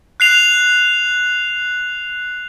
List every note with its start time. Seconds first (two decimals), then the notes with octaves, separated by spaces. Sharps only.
0.20 F#6 C7 F7